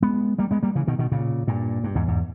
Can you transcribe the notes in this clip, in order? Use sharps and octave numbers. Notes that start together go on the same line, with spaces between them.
G#3 B3
G3 A#3
G#3 B3
G3 A#3
C#3 E3
B2 D#3
B2 D#3
A#2 C#3
G2 A#2
G2
E2 G#2
E2 G#2